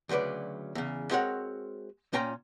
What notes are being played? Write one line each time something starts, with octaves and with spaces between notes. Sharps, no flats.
D2 C#3 F#3 B4 D5
E2 C#3
G#3 C4 F#4 A#4 C#5 F#5
A#2 C#4 F4 G5 A#5 C6